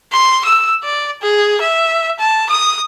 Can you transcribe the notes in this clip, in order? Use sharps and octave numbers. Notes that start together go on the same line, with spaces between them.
C6
E6
D5
G#4
E5
A5
D#6